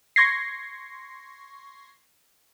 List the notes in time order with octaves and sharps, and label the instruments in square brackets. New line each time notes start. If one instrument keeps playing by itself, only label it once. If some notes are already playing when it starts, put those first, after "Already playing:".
[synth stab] C6 C#6 G#6 A#6 C7